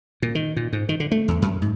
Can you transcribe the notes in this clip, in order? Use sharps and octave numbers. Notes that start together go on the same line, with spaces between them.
A#2
D#3
A#2
G#2
D#3
D3
A3
E2
F#2
G#2